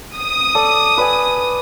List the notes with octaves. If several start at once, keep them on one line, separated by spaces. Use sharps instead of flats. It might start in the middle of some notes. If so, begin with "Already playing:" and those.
D#6
A4 D5
B4 D5 G#5